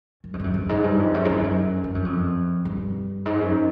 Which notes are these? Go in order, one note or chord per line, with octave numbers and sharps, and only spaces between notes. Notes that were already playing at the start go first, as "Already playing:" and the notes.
F#2
F2
G2
F#2
G2
G#2
G2
F2
F#2
G#2
G2
F#2
G2
F#2
F2
G2
G#2
F#2